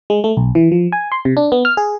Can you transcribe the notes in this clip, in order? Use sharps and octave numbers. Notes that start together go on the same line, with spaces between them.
G#3
A3
B1
E3
F3
G#5
C6
C3
D4
B3
F6
G#4